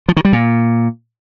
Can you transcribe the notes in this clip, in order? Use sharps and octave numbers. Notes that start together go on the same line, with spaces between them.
F3
D#3
G3
A#2